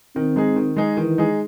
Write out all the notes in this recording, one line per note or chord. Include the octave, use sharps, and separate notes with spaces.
D#3 C4
G#3 D#4 G#4
D#3
G#3 D#4 G#4
D#3 E3
G#3 D#4 G#4